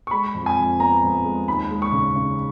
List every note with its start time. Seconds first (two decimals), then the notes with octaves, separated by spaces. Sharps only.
0.07 C#6
0.11 G#3 B5
0.35 F2
0.46 G#5
0.57 F2
0.80 B3 A#5
1.03 F2
1.24 G#3
1.48 D#2 B5
1.71 G#3
1.82 C#6
1.92 C#3
2.16 C#3